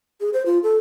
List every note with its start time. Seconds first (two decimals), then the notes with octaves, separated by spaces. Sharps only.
0.21 G#4
0.33 C5
0.46 F4
0.63 A4